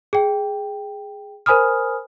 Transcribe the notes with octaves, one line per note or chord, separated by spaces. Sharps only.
G#4 G5
A#4 C5 G#5 B5 D#6 F6